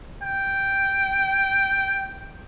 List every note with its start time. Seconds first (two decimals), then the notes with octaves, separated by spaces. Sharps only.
0.22 G5